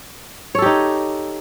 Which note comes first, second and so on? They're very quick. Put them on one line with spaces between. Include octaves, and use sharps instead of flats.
C#5 A4 G4 D#4